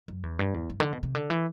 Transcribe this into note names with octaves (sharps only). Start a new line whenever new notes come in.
F#2
E2
G2
E2
G2
D3
B2
C3
D3
E3